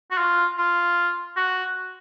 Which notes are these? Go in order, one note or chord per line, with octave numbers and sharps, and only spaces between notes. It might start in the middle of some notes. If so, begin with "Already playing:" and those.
F#4
F4
F4
F#4